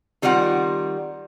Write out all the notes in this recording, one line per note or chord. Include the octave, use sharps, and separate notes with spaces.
D#3 G3 C4 F4 F#5